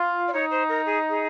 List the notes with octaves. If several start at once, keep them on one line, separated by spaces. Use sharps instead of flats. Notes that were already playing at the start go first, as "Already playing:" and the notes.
Already playing: F4
D5
D#4 C#5
C5
A#4
G#4
G#4